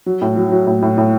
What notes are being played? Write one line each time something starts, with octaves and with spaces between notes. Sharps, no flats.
F#3
A2
F#3
F#3
A2
A2
A2